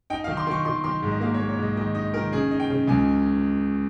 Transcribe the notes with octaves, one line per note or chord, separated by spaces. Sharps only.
D#4 G5
F5
D#3
C6
D#3 C#6
D#3 C6
D#3 C6
G#2
D#5
A#3 F5
C#5
A#3
C#5
G#2 D#5
D#3 D#5
D#4 D#5
D#3 A#4
C#3 G#4
D#4
G5
C#3
C#2 G#5